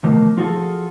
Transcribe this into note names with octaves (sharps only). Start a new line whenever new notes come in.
B2 D#3 F3 A3 A#3
F3 F4 F#4 G#4 A4